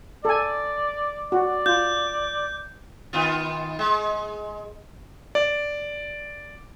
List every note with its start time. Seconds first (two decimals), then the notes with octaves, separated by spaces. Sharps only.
0.25 A4 D5 G#5
1.32 F#4 D5
1.66 F4 G6
3.13 D#3 B3 F4
3.79 G#3
5.35 D5